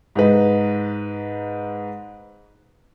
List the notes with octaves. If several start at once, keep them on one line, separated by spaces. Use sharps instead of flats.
G#2 D#4 B4